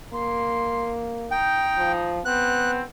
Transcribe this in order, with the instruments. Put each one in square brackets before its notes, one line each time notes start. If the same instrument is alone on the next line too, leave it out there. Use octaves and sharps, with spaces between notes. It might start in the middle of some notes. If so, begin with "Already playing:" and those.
[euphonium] A#3 [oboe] C6
[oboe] D#4 [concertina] G5
[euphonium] F3
[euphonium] B3 [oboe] C4 [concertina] F#6